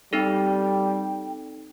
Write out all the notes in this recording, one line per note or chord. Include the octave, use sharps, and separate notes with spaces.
G3 C4 D#4 A4 G5